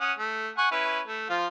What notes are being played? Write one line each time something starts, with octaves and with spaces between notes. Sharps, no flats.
C#4 F#5 D#6
A3
F#5 G#5 C#6
C#4 E4 B4
A3
F3 F4